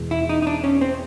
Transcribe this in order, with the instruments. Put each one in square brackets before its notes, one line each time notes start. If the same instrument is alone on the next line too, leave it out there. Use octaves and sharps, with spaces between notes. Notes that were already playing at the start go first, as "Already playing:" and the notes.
Already playing: [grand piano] E2 B2 G#3 B3
[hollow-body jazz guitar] E4
D#4
D#4
D4
C#4
C4